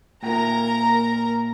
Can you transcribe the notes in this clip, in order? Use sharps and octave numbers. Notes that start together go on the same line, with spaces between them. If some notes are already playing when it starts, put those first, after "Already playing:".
A#2 A#4 G5 A#5